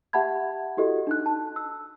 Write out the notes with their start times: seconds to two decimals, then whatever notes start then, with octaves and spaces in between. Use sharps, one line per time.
0.13 G4 E5 F#5 A5 B5 G#6
0.77 E4 F#4 G4 A4 D#5
1.07 D4 D#4 F#6
1.26 A5
1.56 E6